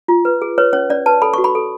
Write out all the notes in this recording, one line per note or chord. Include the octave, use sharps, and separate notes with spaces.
F4
B4
G#4
B4 C#5
C#4 C#5
C#4 D5
B4 A5
A4 B5
F#4 C#6
B5
A4